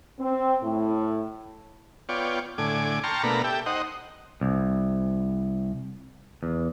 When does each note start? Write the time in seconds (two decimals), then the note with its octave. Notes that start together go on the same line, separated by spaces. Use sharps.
0.19 C4
0.62 A2
2.09 B3 F4 C#5 D5 G5
2.58 A2 D3 G#5 D6
3.03 G5 A5 A#5 C6 C#6 F6
3.23 B2 A3 A#3 D4 A#5 B5
3.44 G4 A4 E5 G5
3.66 D#4 C5 D#5 F#5
4.41 C2
6.43 E2